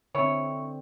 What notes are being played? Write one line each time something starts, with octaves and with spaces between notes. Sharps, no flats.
D3 C4 E4 C#5